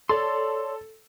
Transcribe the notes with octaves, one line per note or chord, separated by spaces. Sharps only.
A4 C#5 D5 C6